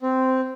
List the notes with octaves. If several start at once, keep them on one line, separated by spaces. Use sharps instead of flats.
C4